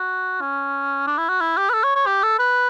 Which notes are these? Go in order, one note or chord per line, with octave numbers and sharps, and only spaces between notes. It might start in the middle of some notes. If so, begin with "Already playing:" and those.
Already playing: F#4
C#4
D4
E4
F#4
E4
G4
B4
A4
C#5
C#5
G4
A4
B4